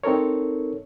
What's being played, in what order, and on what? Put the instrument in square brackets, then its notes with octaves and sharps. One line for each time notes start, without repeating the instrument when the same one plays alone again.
[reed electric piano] C4 D#4 A4 A#4 C#5